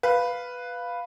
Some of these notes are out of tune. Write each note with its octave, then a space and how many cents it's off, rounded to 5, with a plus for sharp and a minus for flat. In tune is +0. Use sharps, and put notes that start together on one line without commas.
B4 +0 F5 +0